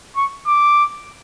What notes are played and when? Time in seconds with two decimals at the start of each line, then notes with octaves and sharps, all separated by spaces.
0.17 C#6
0.47 D6